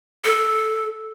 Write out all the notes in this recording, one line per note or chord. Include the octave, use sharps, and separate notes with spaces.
A4